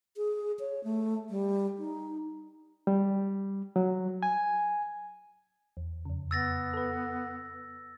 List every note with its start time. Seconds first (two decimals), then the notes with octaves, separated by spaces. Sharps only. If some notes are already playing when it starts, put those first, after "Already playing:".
0.17 G#4
0.60 C#5
0.84 A3
1.30 G3
1.79 D#4
2.87 G3
3.76 F#3
4.23 G#5
5.77 E2
6.05 F2 C#3
6.31 B3 E6 A6 A#6
6.73 A4 B4